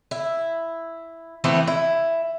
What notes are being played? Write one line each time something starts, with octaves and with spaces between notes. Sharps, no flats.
E4
E3 A3 B3 C4
E4